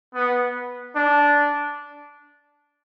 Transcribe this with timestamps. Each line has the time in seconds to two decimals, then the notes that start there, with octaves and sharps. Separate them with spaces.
0.14 B3
0.96 D4